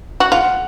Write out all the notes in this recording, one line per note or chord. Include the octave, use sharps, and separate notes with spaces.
F#4
F4 F#5